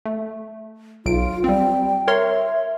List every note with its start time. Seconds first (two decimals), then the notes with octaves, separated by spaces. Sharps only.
0.05 A3
1.06 B1 F4 D7
1.44 G3 C4 G5
2.08 A#4 C#5 E5 C6